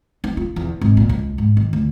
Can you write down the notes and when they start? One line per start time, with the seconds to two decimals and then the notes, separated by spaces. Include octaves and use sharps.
0.24 D#4
0.37 F4
0.56 E2
0.81 G#1
0.97 A#2
1.09 C#2
1.38 G#2
1.57 D#3
1.73 D2